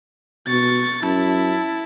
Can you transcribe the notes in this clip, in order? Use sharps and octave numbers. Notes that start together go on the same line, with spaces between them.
B2 C#6 A6
F#2 E4 A5